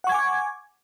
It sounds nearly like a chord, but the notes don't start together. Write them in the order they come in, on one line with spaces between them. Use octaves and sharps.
F#5 C#6 G#6 G#5 D6